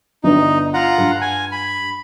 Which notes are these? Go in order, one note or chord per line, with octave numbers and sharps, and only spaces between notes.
G1 D4 D#4 B4
F4 F#5 A#5
G2
G#5
B5